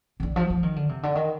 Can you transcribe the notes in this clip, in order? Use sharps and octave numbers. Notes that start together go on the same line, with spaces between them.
C3
D3
F3
F3
D#3
D3
C3
D3
D#3